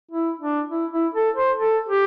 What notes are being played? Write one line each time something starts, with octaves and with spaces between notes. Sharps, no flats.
E4
D4
E4
E4
A4
C5
A4
G4